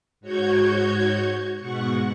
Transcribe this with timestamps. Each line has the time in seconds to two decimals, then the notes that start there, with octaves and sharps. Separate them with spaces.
0.21 G#2 F#4 C#5 C#6 G6 G#6
1.60 G#2 B2 F#5 C#6